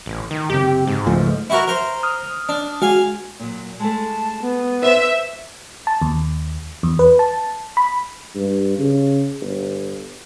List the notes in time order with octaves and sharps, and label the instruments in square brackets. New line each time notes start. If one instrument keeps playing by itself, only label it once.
[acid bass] A1
D#3
[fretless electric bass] F#1 C3 [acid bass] G4
[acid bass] G#2
[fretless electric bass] C#2 F3 A3
[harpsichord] E4 F#4 A#4
A#4 C5
[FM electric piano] D#6 F6
[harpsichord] D4
[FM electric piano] G#3 F#4 [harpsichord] F5 G#5
[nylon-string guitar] A#2 F#3
[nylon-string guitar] G#3 A3 [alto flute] A5
[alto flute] B3
[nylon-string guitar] B4 C5 [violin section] E5
[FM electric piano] A5
D#2
E2
B4
A5
B5
[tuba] G2
C#3
G1